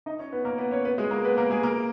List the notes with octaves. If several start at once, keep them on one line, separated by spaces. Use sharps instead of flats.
D#4 D#5
C#4 C#5
B3 B4
A#3 A#4
B3 B4
C#4 C#5
B3 B4
G#3 G#4
A#3 A#4
B3 B4
A#3 A#4
G#3 G#4
A#3 A#4